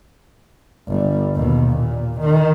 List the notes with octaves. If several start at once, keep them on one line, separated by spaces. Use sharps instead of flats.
G1 G3
D#2 B2
A#2
D#3